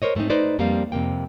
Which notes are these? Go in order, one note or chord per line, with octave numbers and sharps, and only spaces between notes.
A#4 C5 C#5 D#5
G#2 A3 A#3 C4 D#4
D#4 B4 C5 D5
F2 G3 A#3 C4 F5
F2 C3 A#3 G5